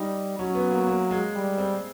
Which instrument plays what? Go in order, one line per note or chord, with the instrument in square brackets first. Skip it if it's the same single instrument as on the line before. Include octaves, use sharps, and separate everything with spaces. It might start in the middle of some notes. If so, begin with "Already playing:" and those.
Already playing: [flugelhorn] G3 [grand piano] D#4
[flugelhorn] F#3 [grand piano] C#4
[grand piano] B3
A#3
A#3
G#3
[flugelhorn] G3
[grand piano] C4